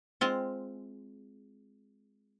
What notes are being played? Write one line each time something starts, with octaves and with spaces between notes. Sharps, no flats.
G#3 C4 F4